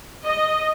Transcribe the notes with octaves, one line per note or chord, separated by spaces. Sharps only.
D#5